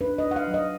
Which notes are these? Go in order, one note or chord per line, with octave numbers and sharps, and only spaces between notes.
D4 B4
D#5
D4
F#5
F5
F#3
D#5